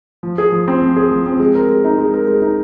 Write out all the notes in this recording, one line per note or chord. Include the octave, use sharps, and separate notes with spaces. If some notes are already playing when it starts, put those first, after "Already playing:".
F3
G#4
F3
C4
F3
G#4
F3
C4
G#3
A#4
G#3
D#4
G#3
A#4
G#3
D#4